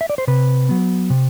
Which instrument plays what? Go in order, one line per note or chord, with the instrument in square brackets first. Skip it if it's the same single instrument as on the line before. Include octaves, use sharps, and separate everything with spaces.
[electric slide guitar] E5
D5
C5
C3 B4
F#3 B3
C3